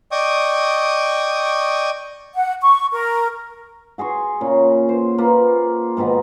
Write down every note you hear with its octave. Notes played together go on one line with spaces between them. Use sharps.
D5 D#5 G5 C#6 D#6
F#5
C#6
A#4
F#4 G#4 C6 C#6
A#2 C#3
C5
A#3 F4 B4
G#2 B2 D#3 B4